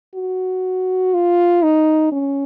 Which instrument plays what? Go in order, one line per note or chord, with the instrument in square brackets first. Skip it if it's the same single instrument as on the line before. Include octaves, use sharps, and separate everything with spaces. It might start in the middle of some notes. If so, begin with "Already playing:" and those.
[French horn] F#4
F4
D#4
C#4